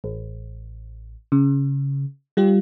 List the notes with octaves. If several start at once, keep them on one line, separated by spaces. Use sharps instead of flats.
A1
C#3
G3 F4 G4